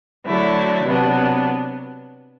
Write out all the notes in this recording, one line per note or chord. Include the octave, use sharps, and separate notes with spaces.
D3 F#3 A3 E4
C3 F#3 B3 D4